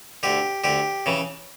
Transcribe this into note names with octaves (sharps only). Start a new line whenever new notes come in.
D2 D3 G4
D2 D3 G4
C#3 E3